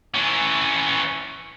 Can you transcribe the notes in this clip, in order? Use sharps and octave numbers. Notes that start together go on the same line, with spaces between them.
E3 C#4